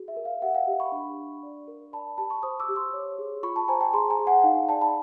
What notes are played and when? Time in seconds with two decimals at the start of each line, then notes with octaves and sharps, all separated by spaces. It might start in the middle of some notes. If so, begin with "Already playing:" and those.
Already playing: F#4 G#4
0.08 E5
0.17 A#4
0.25 F5
0.42 G4 E5 F#5
0.55 F5 G5
0.67 G4
0.80 B5 C#6
0.92 D4 B5 C#6
1.17 D4
1.43 D5
1.68 A#4
1.93 D5 A5 B5
2.18 G4 A5 B5
2.30 B5 C#6
2.43 C5 C#6 D#6
2.60 D6 E6
2.68 G4
2.76 C6 D6
2.94 C#5
3.19 G#4
3.43 F4 B5 C#6
3.56 A5 B5
3.68 C5 G#5 A#5
3.81 G5 A5
3.93 G#4 A#5 C6
4.10 G#5 A#5
4.19 G#4
4.27 F#5 G#5
4.44 D#4 F5 G5
4.69 D5 G5 A5
4.81 A5 B5